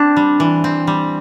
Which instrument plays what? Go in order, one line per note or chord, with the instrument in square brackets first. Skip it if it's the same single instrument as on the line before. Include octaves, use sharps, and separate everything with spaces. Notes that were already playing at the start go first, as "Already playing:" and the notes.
Already playing: [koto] C4 D4
G3
E3
C4
G3